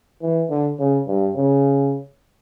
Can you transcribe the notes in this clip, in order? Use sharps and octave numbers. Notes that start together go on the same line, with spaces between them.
E3
D3
C#3
G2
C#3